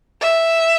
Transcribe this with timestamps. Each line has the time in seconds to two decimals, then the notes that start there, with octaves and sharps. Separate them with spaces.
0.22 E5